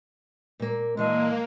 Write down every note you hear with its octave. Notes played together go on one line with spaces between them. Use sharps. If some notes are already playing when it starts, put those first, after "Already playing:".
A#2 A#3
A#2 E3 G#3 A#3 A5